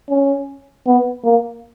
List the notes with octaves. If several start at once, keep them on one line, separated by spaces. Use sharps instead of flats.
C#4
B3
A#3